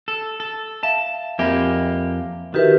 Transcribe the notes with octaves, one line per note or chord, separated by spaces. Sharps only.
A4
A4
E5 F5 A5
F2 A#3 G4 E5 G#5 B5
D#3 E4 F#4 G4 A#4 B4 E5